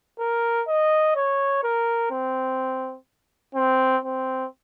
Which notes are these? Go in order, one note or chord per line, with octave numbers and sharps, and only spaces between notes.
A#4
D#5
C#5
A#4
C4
C4
C4